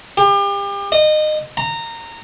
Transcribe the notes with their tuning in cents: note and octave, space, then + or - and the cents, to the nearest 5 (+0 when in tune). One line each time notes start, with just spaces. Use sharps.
G4 +35
D#5 -25
A#5 -20